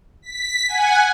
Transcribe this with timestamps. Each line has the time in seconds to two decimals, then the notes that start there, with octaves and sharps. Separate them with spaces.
0.22 B6
0.68 F#5 G#5